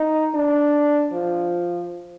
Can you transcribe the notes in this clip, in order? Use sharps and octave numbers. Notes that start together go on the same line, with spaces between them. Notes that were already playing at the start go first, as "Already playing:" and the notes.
Already playing: D#4
D4
F3